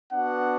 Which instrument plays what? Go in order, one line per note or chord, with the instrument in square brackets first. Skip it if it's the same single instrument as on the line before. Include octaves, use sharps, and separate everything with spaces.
[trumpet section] B3 D4 F#4 F#5